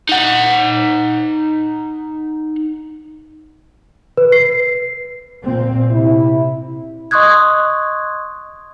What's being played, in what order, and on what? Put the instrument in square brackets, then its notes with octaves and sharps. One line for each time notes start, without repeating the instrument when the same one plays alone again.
[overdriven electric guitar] D#4 F#5
[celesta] B4
C7
[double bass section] A#2 C4
[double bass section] C3 [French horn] E4
[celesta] D#5 C6 C#6 D#6 F#6 G#6